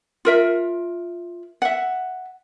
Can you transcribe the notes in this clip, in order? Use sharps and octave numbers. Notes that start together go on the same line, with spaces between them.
F4 A#4 E5
E5 F#5